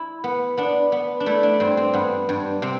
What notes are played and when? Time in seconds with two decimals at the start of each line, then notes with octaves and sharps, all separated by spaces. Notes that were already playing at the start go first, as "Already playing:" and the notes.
Already playing: E4
0.24 B3
0.57 B3 D4
0.92 B3
1.20 D4
1.26 A3 E4
1.43 D4
1.60 G2 C4
1.77 C4
1.93 G2 B3
2.29 G2
2.62 C3 C4